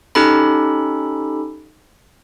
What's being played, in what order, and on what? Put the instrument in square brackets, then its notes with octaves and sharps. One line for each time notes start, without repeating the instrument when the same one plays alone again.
[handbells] C#4 D#4 G4 A4 B5